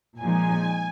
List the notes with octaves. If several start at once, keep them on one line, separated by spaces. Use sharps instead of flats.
A#2 F3 G#3 D#4 G#5